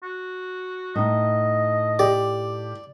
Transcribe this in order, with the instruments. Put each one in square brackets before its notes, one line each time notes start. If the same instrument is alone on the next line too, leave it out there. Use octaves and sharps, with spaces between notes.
[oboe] F#4
[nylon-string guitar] A2 D#4 [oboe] D#5
[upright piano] G4 [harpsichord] D5